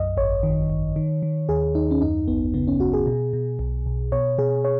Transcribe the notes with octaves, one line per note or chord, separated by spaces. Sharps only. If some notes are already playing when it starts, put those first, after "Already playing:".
Already playing: B1 F#2 D#5
G#1 C#5
D#3
G#1
D#3
D#3
D#2 G#4
D#2 D#4
C#4
F#2 D#4
G#1 B3
C#3 B3
C#4
G#1 F#4
G#4
B2
B2
B1
B1
B2 C#5
B2 G#4
C#5